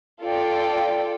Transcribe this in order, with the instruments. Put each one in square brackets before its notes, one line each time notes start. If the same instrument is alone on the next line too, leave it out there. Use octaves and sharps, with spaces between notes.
[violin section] F4 A4 D5 G5